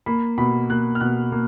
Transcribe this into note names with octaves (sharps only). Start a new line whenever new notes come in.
A#3 B5
B2 B5
A#3 F#6
F6
B2 F#6
A#3